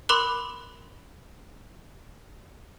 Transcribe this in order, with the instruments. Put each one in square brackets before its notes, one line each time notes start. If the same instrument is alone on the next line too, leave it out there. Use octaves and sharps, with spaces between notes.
[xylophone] A#4 B5 C6 D6 F#6 G7